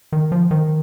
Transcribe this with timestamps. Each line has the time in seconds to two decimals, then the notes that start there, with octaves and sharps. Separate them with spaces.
0.12 D#3
0.32 F3
0.51 D#3